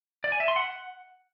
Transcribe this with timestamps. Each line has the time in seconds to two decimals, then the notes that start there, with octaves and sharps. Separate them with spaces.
0.24 D5
0.32 G#5
0.40 E5
0.48 C6
0.56 F#5